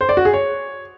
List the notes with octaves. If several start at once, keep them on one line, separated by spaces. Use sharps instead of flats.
C5
D5
F#4
G#4
C#5